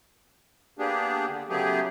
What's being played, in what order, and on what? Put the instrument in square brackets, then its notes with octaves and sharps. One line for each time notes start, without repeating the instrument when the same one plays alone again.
[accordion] A#3 B3 D4 G4 G#4
D3
C#3 F#3 A3 B3 G4 G#4